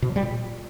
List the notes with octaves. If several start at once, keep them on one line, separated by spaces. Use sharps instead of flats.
B2
F#3
G3
A#2